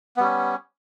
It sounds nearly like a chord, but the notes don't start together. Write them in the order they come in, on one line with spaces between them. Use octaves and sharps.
B3 G3 C#4